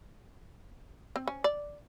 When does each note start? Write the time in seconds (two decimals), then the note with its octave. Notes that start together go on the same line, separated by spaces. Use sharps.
1.16 C4
1.28 C#4
1.44 D5